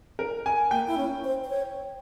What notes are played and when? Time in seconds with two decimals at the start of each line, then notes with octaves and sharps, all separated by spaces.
0.19 A#4
0.46 G#5
0.71 A#3 G5
0.87 E4
0.97 C#4
1.24 C5
1.44 C5
1.50 C#5